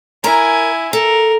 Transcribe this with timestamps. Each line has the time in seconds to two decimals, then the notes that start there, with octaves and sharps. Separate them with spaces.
0.24 E4 A#4 G#5 A#5
0.93 A4 A#4